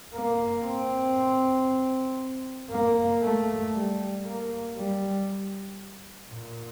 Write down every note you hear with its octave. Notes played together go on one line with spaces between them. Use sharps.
A#3
C4
A#3
A3
G3
A#3
G3
A#2